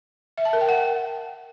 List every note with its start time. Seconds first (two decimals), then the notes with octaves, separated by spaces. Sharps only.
0.38 E5
0.45 A5
0.53 A#4
0.61 G5
0.69 F#5